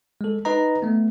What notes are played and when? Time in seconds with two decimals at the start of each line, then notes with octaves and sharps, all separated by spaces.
0.21 G#3 A4
0.45 D#4 B4 D#5 A#5
0.82 A3 B3